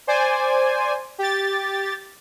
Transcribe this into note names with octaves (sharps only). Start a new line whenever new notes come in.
C5 D5 G#5
G4 A6